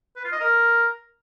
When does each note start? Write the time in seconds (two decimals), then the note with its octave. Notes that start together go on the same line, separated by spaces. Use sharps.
0.16 B4
0.24 F4
0.32 D#5
0.40 A#4